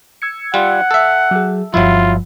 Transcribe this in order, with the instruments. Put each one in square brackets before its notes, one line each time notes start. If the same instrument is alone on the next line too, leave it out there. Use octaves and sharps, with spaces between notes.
[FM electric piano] E6 G#6 C#7
[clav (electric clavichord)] G3 F4 [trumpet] F#5
[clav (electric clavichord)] A4 E5
[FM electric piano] F#3 G#4
[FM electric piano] G1 G2 F3 [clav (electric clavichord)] F#3 E4 [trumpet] F4